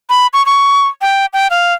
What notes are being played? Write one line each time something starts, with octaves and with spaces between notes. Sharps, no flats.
B5
C#6
C#6
G5
G5
F5